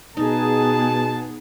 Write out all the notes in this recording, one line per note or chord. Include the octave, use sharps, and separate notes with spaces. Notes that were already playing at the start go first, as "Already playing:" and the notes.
B2 B3 D#4 G#4 A5